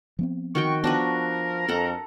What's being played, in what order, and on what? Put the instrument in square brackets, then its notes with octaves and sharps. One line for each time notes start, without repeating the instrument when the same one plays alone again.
[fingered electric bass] F3 B3 C4
[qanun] D#3 F#4 G5 [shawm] C#6
[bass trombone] F3 [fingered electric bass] B3 [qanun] D4 F#4 B4 [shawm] A#4
[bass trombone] F2 [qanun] A4 F#5 A#5